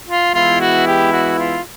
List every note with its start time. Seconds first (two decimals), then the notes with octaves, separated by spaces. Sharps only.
0.08 F4
0.34 E3 G#3 B3 E4 F4
0.61 F#4
0.87 G4
1.13 F#4
1.38 F4